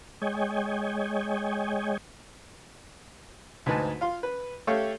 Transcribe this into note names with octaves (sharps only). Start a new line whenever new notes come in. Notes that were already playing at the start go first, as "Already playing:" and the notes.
G#3 C#5 D#5 G5 G#5
D2 G#2 D#4 B4 G#5 A5
F4 F5 C6
B4
A3 G4 A4 C#5 F5